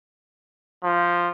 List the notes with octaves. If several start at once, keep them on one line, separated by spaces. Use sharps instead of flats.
F3